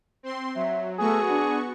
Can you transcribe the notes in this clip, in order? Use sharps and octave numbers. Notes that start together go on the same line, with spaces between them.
C4 C6
F#3 E5
A3 B3 F#4 G#4 C#6
D4